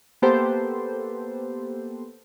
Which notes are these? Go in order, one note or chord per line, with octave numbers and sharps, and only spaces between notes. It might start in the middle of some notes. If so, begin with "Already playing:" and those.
A#3 B3 G4 A4 B4 C5